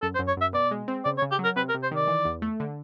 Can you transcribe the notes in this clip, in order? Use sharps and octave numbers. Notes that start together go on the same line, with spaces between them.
F#2 A4
C5
F#2
C#5
F#2 E5
B2 D5
G#3
C4
C#3 D5
C#5
C#3
G4
F#3
A#4
C3 B4
A#4
C3
C5
D#3 D5
E3
E2
A3
D3